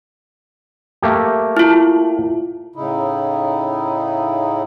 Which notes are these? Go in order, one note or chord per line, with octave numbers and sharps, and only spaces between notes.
A3 A#3 G4
E4 F4
A2 C#3 D#4 E4